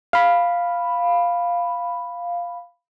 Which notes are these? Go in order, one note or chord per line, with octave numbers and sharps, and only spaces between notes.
F5 B5